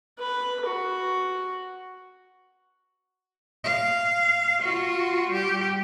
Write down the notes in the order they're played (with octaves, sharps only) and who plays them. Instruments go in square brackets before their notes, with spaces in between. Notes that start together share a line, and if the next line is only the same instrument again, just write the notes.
[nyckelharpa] B4
F#4
[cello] F5
F4 F#4
G3 G4